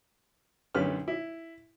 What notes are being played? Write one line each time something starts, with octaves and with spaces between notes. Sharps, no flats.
B1 F#2 D3 G4 B4 F6
E4